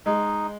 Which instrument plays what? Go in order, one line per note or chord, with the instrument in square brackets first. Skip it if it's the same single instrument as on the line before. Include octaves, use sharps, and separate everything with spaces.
[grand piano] G#3 [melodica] D#4